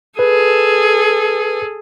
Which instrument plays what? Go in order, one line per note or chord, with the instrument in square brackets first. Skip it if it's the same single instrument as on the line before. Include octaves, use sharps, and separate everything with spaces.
[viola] G#4 A4 [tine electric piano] B4